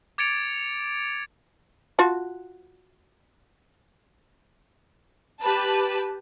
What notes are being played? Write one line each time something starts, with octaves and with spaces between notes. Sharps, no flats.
D6 G#6 A6 C#7 D7 F7
F4 F#4 A5
G4 B4 A5